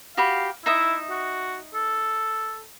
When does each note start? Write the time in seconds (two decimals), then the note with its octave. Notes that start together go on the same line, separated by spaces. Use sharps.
0.17 F#4 G4 F5 B5
0.66 D#4 E4 E5 D#6
1.10 F#4
1.74 A4